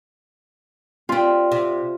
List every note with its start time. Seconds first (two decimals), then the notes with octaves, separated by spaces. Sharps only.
1.09 G3 C4 F4
1.52 C3